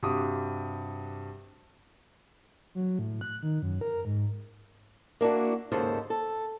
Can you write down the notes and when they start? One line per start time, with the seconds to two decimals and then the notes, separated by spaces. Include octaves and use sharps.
0.03 G2 C3 F#4 D6 D#6
2.75 F#3
2.99 A2
3.21 F#6
3.43 D#3
3.62 F#2
3.81 A#4
4.05 G#2
5.21 A#3 D4 E4 F#4
5.72 D#2 G#2 C#3 A4 C5
6.10 A4